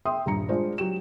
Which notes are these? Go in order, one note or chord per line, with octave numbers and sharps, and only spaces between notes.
E5 G5 C6 D#6
D#1 G2 A#5 C#7
G#3 D4 F4 C5 D5
F#3 F#4 G4 E7